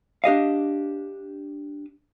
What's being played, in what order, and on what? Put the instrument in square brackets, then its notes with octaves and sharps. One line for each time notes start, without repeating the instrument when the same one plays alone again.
[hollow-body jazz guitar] D4 G4 D#5 F5